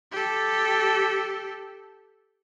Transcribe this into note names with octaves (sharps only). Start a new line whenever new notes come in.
G4 A4